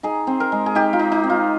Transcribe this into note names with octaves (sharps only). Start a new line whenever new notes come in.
D#4 G#4
C4
A#4
G#3
G#4
D#4 G4
F4
D#4
D#4
C4
F4